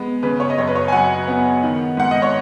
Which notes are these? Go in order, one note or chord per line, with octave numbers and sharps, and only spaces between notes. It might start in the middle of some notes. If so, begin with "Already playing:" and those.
Already playing: G#3 B3
C#3 B4
C#5
D#5
F#2 C#5
B4
C#5
G#5
F#3 F#5
B3
D#3
G#2 F#5
D#5
C#5